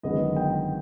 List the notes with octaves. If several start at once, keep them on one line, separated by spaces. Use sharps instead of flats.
G1 F#2 D#3 G#3 B3 D#5
G5